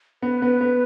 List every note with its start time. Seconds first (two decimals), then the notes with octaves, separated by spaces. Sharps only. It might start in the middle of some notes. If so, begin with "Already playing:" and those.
0.22 B3 B4
0.42 B3
0.61 B3